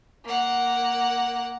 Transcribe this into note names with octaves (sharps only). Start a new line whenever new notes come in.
A#3 F#5